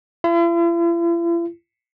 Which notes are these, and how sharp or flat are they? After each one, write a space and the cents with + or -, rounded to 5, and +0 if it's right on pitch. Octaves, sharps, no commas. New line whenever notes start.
E4 +45